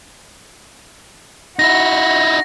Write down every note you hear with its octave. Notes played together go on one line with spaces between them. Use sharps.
D#4 E4 F#4 A#6